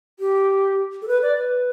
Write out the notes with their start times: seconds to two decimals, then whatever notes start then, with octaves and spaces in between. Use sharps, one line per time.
0.19 G4
1.02 A4
1.08 B4
1.22 D5
1.37 B4